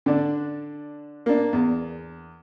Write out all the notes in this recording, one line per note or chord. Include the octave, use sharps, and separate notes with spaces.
D3 D4
A#3 D4
E2